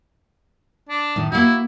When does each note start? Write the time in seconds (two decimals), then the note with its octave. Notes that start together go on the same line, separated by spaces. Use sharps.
0.89 D4
1.16 A2 D#3
1.32 A#3 E4 F#4